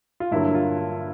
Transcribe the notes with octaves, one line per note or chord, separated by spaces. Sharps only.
F4
G2 D3 F#3 A#3 E4
F4